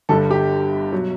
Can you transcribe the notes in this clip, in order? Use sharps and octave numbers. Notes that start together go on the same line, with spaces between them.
G1 G2 D3 G3 A4
G4
B2 F#3